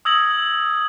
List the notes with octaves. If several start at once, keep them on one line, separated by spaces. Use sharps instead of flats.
D#6 E6 G#6 A#6 F#7